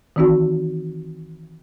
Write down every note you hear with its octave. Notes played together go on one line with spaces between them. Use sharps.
D#3 E3 C4 D#4 F#4